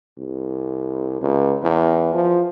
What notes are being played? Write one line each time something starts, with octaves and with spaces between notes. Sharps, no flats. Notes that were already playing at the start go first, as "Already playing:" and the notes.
C2
C#2
E2
F3